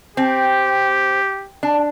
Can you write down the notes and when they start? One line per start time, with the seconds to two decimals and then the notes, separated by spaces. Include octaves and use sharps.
0.16 C4 G4
1.63 D4